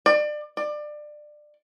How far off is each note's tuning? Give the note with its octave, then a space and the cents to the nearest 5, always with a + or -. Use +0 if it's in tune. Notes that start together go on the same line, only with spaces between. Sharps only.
D5 +30
D5 +25